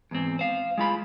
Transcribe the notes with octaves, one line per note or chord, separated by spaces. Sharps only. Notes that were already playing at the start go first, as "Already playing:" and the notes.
E2 G#2 C4
C5 F5
G#3 F4 B5